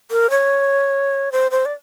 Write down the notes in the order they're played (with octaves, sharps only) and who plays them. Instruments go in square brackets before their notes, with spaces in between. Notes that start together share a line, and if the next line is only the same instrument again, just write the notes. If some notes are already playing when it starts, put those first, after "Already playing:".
[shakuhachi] A#4
C#5
C5
C5
D5